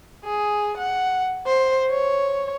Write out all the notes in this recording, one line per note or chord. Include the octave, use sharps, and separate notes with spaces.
G#4
F#5
C5
C#5